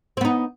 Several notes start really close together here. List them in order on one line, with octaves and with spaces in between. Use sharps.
C4 B3 D#4